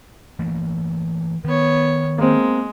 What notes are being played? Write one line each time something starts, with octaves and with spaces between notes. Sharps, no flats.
E3 A3 A#3
D#3 B3 C#5
G#3 A#3 C4